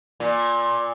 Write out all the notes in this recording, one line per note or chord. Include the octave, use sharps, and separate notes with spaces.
A#2